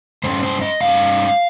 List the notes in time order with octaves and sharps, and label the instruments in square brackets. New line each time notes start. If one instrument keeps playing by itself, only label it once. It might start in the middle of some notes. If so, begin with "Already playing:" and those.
[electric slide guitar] G2 G3 C#4 C5
C5
D#5
G2 G3 C#4 F5